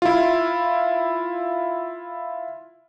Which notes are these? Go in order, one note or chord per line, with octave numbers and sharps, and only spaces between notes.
E4 F4